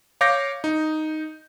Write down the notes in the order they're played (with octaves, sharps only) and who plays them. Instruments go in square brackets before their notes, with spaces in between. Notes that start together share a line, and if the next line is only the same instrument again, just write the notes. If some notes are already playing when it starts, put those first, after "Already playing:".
[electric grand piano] C#5 F5 D6 G6 A#6
D#4